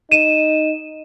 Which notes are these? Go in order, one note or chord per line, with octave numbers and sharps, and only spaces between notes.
D#4 D#7 E7